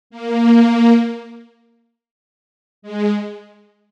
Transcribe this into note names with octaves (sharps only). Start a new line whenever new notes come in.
A#3
G#3